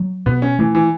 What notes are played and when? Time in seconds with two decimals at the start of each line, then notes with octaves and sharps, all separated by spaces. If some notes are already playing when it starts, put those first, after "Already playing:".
Already playing: F#3
0.26 B2 B3
0.42 C#4
0.59 E3 A3
0.75 E3